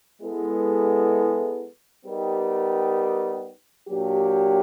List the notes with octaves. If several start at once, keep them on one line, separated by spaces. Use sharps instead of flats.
G#3 B3 E4 A4
G3 B3 D#4 G4 A#4
A#2 F#3 A#3 D4 G4